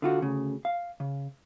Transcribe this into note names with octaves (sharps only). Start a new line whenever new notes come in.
D3 F4 F#4
D2 C#3
F5
C#3